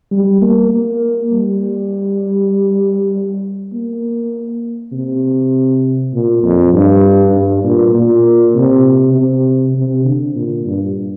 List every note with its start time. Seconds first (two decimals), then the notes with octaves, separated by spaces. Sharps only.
0.11 G3
0.42 A#3
0.71 A#3
1.33 G3
3.73 A#3
4.92 C3
6.13 A#2
6.43 F2
6.73 G2
7.34 G2
7.64 A#2
7.94 A#2
8.55 C3
9.14 C3
9.75 C3
10.04 D3
10.35 A#2
10.65 G2